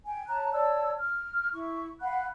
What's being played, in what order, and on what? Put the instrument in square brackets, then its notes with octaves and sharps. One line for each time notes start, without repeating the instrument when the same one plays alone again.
[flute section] G5 G#5
C#5 A5 A#5 F#6
C#5 D5 A5 E6
F6
E4 C#6
F5 F#5 B5 F#6